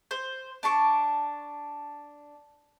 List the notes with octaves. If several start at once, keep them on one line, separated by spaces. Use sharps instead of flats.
C5
D4 A5 C#6 D6